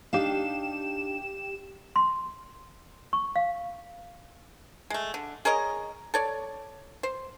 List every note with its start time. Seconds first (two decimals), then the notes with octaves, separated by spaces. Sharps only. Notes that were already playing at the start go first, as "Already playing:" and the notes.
0.13 D4 D#4 G4 F5 E7
1.96 C6
3.13 C#6
3.36 F5
4.90 G#3 A3
5.14 D3
5.45 G#4 A#4 C#5 D#5
6.14 A4 C#5 D5
7.03 C5